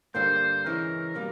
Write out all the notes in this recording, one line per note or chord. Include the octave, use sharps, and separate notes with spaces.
G2 D3 G3 A#3 C5
C#3 E3 G#3 C#4 A#4
B2 G3 A#3